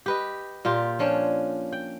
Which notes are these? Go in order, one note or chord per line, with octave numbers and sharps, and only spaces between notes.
G4 B4 D#5
A#2 F4 G4
F3 C#4 D4 C#5
G5